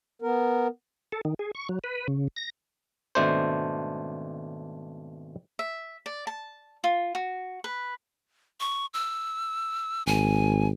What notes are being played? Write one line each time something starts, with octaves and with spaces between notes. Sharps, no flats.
B3 A#4
A4
D#3
G#4
C#6
F#3
B4
C#3
A#6
G#1 B2 A3 D4 C5
E5
D5
A5
F4
F#4
B4
C#6
E6
G#1 G#5